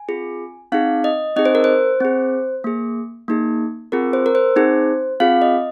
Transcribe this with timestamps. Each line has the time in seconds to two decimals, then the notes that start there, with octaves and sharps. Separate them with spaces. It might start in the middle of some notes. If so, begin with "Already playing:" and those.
Already playing: G#5
0.08 C4 F4 G#4
0.72 C4 D#4 G#4 F5
1.04 D#5
1.36 C4 D#4 G#4 D#5
1.45 C5
1.55 A#4
1.64 C5
2.00 C4 G#4
2.64 A#3 G#4
3.28 A#3 D#4 G#4
3.92 C4 F4 G#4 A#4
4.13 C5
4.26 A#4
4.35 C5
4.56 C4 D#4 G#4
5.20 C4 F4 G#4 F5
5.42 D#5